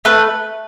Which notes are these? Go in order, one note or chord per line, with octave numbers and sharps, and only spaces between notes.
A3 B4